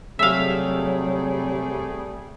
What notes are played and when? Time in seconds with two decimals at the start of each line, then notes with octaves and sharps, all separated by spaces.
0.19 C3 F#3 G3 A3 G#4 E5 F5